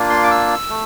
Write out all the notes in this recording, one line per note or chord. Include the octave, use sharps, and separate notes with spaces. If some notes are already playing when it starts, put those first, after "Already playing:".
Already playing: A#3 D4 F4
C6
D6
E6
A3